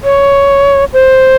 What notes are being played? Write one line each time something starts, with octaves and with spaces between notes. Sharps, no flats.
C#5
C5